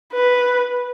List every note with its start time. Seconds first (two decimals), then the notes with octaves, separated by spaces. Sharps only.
0.13 B4